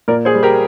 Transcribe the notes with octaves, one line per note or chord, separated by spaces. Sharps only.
A#2 A#4 D5
G#4 C5
G3
G4 A#4